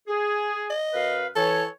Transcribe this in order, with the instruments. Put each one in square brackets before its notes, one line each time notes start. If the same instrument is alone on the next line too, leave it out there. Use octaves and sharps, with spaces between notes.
[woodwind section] G#4
[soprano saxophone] D#5
[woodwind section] F#2 B4 F5
[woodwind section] E3 C#5 [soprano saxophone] A4